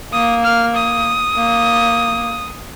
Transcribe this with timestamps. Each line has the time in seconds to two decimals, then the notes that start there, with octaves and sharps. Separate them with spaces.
0.13 A#3 D#6
0.43 F6
0.75 D#6
1.35 A#3